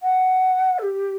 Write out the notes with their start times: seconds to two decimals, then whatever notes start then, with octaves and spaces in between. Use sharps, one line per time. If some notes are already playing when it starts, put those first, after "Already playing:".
0.02 F#5
0.78 A4
0.82 G4